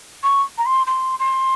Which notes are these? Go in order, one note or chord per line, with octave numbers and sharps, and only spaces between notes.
C#6
A#5
C6
C6
C6